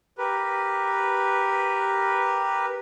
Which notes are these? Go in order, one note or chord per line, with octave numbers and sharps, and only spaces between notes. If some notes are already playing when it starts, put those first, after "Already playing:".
G4 A#4 B4